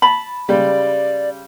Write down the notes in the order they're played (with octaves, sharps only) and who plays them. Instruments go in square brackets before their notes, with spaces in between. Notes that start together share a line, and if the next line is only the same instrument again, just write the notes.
[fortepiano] A5 [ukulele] B5
[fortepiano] C#3 G3 G#3 [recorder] D5